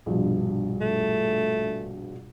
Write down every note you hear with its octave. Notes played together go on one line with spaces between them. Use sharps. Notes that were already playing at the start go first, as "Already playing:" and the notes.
A#1 G2 B2
A3